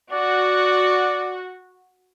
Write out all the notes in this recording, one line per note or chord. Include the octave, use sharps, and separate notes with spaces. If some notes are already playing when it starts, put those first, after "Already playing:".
F#4 D5